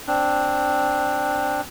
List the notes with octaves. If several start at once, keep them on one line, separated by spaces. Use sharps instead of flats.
C4 D4